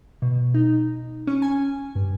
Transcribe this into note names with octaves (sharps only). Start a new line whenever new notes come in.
B2
D#4
C#4
G#5
G2